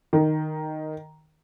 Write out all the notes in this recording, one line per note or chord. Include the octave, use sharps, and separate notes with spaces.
D#3